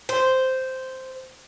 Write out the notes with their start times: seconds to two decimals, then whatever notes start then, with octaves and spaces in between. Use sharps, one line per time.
0.09 C5